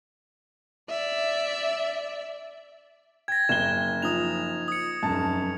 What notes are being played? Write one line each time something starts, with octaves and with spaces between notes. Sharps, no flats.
D5 E5
G5 G#6 A#6
F#1 E7 G7
F3 D#4 D#6 F7
D#6 C#7
F1 F#2 A5